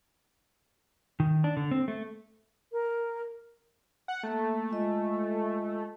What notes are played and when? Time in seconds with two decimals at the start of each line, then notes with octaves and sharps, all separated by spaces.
1.20 D#3
1.44 D4
1.57 D3
1.71 C4
1.88 A3
2.72 A#4
4.08 F#5
4.23 A3 A#3 A5
4.71 G#3 F4 D#5